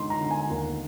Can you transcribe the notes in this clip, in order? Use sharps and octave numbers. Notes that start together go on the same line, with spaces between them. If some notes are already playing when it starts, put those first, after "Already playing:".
Already playing: D3 G#3 D#4 C6
A#5
D3 A#5
G#5
D#2